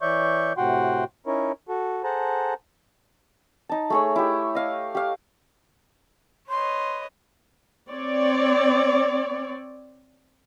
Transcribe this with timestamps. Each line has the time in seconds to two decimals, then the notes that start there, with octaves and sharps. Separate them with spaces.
0.02 E3 C#5 D5 E5 C#6 G6
0.57 A2 C3 F#4 F#5 G5 C6
1.27 C#4 D#4 E4 A#4 C#5
1.69 F#4 A4
2.04 G#4 A4 C5 F#5 A5 A#5
3.69 D#4 A5
3.90 A3 G#4 C#5
4.16 E4 G4
4.55 D#5 F5
4.95 G4 F5
6.49 B4 C#5 D#5 C6
7.90 C4 C#5 D5